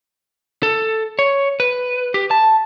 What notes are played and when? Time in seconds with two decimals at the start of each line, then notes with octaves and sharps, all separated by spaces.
0.63 A4
1.19 C#5
1.60 B4
2.14 G4
2.31 A5